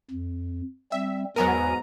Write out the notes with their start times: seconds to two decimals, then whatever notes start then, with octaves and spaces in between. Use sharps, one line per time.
0.11 F2
0.92 G3 C4 E5
1.36 E2 G#2 F#3 B3 A#4 G#5 A#5